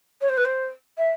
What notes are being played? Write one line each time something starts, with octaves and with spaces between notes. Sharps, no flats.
C#5
C5
B4
C5
E5